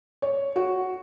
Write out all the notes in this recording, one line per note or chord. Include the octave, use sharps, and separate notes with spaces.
C#5
F#4